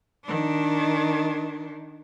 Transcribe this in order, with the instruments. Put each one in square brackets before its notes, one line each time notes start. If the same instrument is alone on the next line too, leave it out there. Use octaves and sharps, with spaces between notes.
[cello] D#3 D4